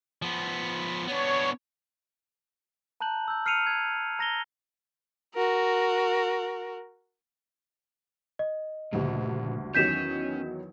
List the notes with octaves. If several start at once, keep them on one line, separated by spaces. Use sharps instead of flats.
F3 B3
B3 D4 C#5
A5 A#5 F#6 G6 F#7
E6 G6
F6 C7 C#7 D#7 F7
F6 F#6 G#6
A#5 A#6 F7 G7
F#4 A#4
D#5
F#1 D2 G2 A#2 F3
E2 D#3 F#3 C#4 G6 B6 E7